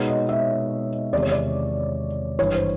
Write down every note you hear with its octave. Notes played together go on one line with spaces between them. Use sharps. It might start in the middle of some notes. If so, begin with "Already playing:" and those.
Already playing: B2 G#3 B3 D#4 C#5
D#5
E5
E2 C3 D#3 G#3 D5
C#5
D5
G#1 G2 E3 C#5
C5